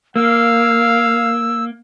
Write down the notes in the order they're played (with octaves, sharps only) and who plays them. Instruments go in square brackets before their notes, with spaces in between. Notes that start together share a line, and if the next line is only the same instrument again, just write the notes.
[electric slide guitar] A#3 [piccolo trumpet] F5 [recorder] E6